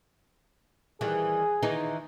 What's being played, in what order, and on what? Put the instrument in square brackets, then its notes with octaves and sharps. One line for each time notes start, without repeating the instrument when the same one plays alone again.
[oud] D#3 E3 G3 [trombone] G#4
[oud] D#3 E3 D#4